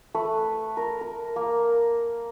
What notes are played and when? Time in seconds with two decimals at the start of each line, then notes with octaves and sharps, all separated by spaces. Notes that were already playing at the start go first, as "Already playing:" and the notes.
0.14 A3 B4
0.77 A#4
1.01 A#4
1.36 A#3